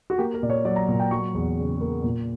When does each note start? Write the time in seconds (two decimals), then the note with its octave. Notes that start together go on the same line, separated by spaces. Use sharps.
0.10 F#4
0.18 A#3 G4
0.34 A#4
0.43 A#2 D5
0.50 C#5
0.65 F#3 D5
0.76 A#5
0.88 A#2
1.00 G5
1.11 F#3 C#6
1.34 E2
1.58 C#3
1.81 A#3
2.04 A#2